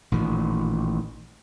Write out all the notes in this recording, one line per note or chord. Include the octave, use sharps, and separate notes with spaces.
A1 A#2 D#3